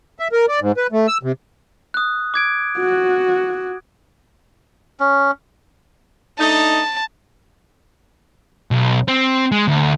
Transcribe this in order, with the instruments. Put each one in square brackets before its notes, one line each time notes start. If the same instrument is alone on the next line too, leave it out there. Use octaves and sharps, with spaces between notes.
[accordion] E5
A#4
D5
G#2
B4
A3
E6
C3
[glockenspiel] D#6 F#6
D6 G#6 D7
[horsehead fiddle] F#4
[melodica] C#4
[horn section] A3 D4 D#4 [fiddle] A5
[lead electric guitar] B1
C4
G#3
D2